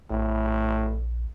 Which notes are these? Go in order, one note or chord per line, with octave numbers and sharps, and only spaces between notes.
A#1 A2